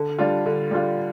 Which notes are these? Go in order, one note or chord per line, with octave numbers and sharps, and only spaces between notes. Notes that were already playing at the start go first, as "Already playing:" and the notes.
Already playing: D3
G3 D4 F4
D3
G3 D4 F4